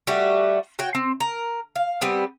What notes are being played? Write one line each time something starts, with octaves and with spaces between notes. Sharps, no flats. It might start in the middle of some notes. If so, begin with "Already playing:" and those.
G3 A3 F#4 G4
F#4 C#5 G5
C4
A#4
F5
G3 B3 C4